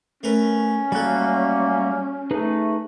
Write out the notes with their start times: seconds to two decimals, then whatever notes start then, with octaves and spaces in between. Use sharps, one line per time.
0.23 A3 C#4 A#4 B4
0.92 F#3 G3 A3 A#3 F#4 A4 F#6
2.31 A3 D#4 G#4 B4